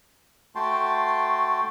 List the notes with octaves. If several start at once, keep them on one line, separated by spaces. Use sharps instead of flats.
A3 F#4 G5 A5 C6